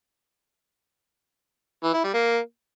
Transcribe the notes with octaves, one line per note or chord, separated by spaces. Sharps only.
E3
E4
G3
A#3